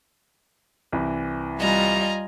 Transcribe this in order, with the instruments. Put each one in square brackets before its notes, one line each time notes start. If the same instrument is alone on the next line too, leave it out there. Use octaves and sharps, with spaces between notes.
[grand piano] C2 E3
[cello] G3 [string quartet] F4 D#5 G#5 [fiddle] A#5